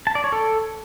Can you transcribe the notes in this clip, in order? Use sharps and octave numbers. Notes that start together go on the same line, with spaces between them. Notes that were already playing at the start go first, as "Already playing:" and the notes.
A5
D5
C#5
A4